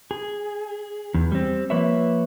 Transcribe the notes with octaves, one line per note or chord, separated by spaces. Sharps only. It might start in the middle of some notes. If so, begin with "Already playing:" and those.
G#4
E2
G3 C4
F3 A#3 B4 C#5 E5